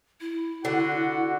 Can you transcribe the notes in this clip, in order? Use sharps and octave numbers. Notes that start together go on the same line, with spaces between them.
E4
D3 F#4